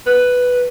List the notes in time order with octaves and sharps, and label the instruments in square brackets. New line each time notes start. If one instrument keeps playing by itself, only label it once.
[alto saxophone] B4